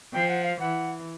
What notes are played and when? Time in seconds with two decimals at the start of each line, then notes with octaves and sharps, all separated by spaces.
0.14 F3 G5
0.30 F#5
0.44 F5
0.60 E3 F#5